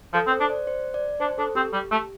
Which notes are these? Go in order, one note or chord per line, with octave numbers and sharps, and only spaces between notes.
F3 A4
C4
C5
D4
D5
C5
D5
D4 C5
D4 A4
C4 G4
G3
A3